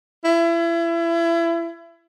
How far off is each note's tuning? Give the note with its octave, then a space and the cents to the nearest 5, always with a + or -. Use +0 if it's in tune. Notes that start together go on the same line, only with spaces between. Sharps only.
E4 +30